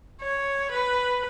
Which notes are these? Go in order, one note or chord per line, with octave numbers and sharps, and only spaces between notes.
C#5
B4